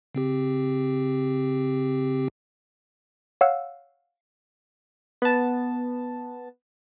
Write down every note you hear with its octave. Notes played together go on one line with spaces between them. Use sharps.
C#3 C4 G4
C#5 F5 F#5 E6
B3 A5